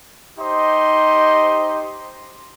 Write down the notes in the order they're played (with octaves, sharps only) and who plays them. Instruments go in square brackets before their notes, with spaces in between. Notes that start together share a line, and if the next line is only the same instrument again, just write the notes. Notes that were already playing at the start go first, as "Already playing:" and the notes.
[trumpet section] D#4 G4 C5 D#5 C6